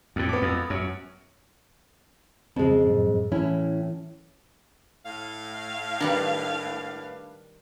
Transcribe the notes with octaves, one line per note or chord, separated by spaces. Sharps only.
F2 A2
B3 D6
F2
F#2 C#5
F2 C#3 G#3 C4
F#2 A2
A2 E3 C#4 E4
A2 F5
D#3 G3 D4 G4 B4